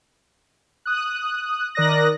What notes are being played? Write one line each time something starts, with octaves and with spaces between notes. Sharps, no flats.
D#6 F#6
D#3 A#4 D5 D#6 F#6 A#6